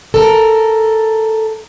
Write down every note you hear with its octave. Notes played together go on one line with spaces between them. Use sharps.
A4 A#4